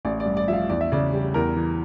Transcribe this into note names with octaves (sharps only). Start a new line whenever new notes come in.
A1 D5
D5
G2
D5
F3 E5
F5
E2 D5
E5
C#3 D5
G3
E2 A#4
E3